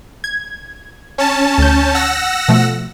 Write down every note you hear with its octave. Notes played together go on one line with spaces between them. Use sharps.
G#6
C#4 A5
D2 G6
F#5 E6 A#6
B2 F3 A3